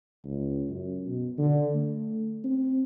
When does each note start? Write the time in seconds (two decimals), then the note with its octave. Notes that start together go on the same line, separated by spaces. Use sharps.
0.24 C#2
0.69 F#2
1.07 B2
1.38 D3
1.74 A3
2.44 C4